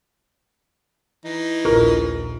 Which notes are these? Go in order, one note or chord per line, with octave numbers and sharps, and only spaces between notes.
E3 D#4
A#1 D#2 F4 A#4